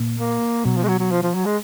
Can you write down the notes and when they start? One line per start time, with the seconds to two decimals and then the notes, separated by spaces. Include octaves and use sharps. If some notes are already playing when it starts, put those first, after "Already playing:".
Already playing: A#2
0.19 A#3
0.65 B2 F#3
0.77 F3
0.84 G#3
0.88 F#3
0.99 F#3
1.11 F3
1.23 F3
1.34 F#3
1.46 G#3